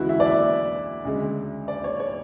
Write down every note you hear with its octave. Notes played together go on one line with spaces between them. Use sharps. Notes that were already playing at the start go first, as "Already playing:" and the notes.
Already playing: D2 C#3 E3 G#3 E4 F#4
E5
D5
E5
D2 C#3 G#3
D5
C#5
C#5